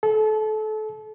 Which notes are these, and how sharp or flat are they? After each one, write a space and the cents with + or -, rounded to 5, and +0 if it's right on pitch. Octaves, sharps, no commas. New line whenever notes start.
A4 -30